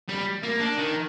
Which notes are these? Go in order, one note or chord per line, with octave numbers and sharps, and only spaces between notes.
G3
A#3
D4
D#3